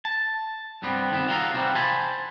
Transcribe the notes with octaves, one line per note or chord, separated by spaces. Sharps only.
A5
C2 G2 G3 B3 C4
D3 D#3 G#3 B3 C4
F4 F#4 A4 A#4 E5 F5
C3 E3 G3 C4 F#4
C5 G#5 A5 B5